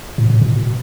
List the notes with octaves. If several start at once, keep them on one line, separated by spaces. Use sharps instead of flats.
A2
A2
B2